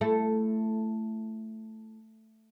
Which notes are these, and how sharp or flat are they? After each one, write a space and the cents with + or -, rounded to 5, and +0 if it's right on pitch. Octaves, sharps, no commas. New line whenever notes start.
A3 +0 E4 +25 A4 +0